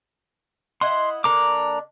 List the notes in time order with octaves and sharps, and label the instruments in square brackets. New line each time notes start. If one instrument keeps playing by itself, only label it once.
[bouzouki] E4 D#5 F#5 [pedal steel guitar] C6
[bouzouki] D3 A#3 D4 [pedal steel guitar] A#5 D6